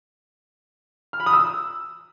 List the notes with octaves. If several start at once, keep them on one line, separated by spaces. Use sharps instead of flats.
F6
B5
D#6
E6